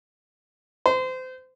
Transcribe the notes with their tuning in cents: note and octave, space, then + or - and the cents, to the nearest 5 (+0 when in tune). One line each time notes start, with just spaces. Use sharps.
C5 -30